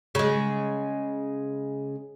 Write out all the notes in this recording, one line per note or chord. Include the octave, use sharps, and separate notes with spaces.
C#3 G#3